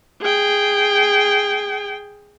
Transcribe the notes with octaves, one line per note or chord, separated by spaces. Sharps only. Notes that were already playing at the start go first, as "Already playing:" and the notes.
G#4 G5